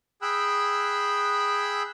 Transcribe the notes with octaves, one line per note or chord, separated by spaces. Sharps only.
G#4 G5 B5 E6 F#6